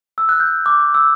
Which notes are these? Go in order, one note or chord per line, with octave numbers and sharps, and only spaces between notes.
E6
F#6
G6
D6
D6
E6